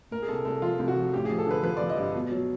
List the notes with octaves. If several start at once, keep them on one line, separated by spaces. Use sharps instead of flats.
A#2 A#4
G#4
C2 A4
C2 A4
F3 F4
C2
F#4
F3
A1 G4
F3 G#4
A4
D3 B4
F3 B4
F3 D5
D#5
G2
B2
F#3